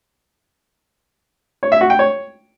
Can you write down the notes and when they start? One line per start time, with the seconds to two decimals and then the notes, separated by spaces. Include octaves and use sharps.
1.63 C#5
1.72 E5
1.81 F#4
1.90 G5
1.99 C#5